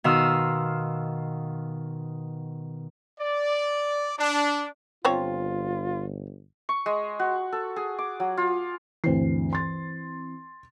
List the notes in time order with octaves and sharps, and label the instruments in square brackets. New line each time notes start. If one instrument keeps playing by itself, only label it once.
[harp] B2 D#3 F5 C6 D#6 E6
[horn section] D5
D4
[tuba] G1 [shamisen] F3 C4 C#5 [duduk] F4
[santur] C#6
G#3
F#4
A4
G#4
D6
F#3
F4
[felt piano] D2 G2 C7 [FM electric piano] E3 C4
[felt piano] C6 A6